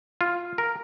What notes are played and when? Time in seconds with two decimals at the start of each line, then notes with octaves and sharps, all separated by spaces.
0.21 F4
0.58 A#4